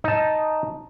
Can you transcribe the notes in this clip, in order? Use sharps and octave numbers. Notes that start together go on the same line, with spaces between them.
D#4 A5